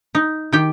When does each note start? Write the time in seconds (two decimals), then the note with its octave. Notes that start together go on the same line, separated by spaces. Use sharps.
0.15 D#4
0.52 D#3 G4 G5